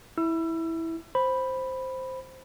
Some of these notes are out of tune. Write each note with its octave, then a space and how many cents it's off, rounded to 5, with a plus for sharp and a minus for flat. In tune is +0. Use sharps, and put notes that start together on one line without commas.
E4 -10 E6 +30
C5 +0 B5 +0